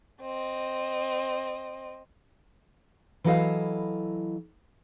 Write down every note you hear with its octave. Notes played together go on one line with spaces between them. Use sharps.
C4 D#5
E3 F#3 E4 A4 D#5 F5